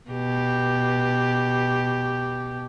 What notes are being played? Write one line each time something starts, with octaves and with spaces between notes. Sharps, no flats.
B2 G4